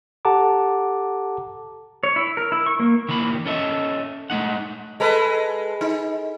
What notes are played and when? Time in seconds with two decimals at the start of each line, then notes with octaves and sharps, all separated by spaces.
0.25 G4 A4 F#5 A5 A#5 D6
2.03 C#5
2.16 E4
2.37 A#4
2.52 E4
2.66 C#6
2.80 A#3
3.09 D#3 E3 A#3 B5
3.46 C#4 A4 D#5 E5
4.30 G#3 A3 D#4 F#5
5.00 G#3 A4 B4
5.81 D#4